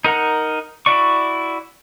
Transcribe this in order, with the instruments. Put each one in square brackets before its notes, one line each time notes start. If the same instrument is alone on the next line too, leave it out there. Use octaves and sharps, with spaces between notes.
[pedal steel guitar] D#4 A#4 F#5 A#5
E4 F#4 D5 C#6